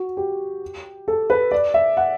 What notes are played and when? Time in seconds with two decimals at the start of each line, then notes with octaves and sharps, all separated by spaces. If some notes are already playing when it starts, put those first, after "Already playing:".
Already playing: F#4
0.17 G4
1.08 A4
1.30 B4
1.51 D5
1.74 E5
1.97 F#5